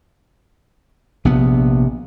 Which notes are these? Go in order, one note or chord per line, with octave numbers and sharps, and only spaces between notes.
A#1 C3 B3